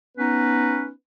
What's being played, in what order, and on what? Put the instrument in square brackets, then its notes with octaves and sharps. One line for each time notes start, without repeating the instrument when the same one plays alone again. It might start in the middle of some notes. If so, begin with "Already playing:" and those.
[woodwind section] B3 C#4 D#4 B4